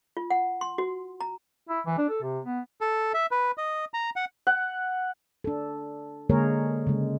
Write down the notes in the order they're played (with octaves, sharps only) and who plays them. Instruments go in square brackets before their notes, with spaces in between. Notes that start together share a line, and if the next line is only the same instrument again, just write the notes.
[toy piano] F4
F#5
C6
F#4
A#5
[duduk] E4
E3
D4
A4
C3
B3
[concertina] A4
E5
B4
D#5
A#5
F#5
[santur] F#5
[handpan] D4 A4
D3 G#3 A#3 G#4 A#4 C#5
C#3 G#3